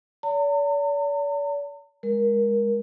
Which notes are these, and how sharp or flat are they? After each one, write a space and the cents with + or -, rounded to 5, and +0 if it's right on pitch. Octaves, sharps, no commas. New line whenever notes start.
D5 -45 A#5 -45
G#3 -10 A#4 +20